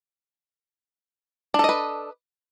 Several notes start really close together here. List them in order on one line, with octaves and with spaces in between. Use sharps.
D4 A4 D#5 B4